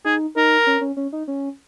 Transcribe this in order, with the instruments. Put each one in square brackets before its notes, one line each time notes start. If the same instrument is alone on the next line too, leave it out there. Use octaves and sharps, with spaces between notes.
[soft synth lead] D#4 [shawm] G#4
[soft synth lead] D#4 [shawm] A#4
[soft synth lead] C#4
C#4
C#4
D#4
C#4